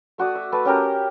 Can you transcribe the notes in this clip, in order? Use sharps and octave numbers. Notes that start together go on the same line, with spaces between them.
A3 F#4 D5 D#6
E5
A3 B4 A5
C#4 G4 A#4 A#5